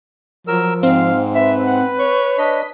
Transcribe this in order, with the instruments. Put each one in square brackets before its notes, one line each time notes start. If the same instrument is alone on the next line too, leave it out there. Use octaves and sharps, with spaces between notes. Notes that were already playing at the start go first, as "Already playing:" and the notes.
[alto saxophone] F3 [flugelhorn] F#3 [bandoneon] A#4 E6
[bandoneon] G#2 [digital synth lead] C4 [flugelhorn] F5
[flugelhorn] B4 [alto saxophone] E5
[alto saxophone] F#5
[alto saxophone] C#5 [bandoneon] C#6
[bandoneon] D4 D#5 [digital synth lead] B6